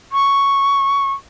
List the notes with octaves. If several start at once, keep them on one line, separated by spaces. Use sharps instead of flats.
C#6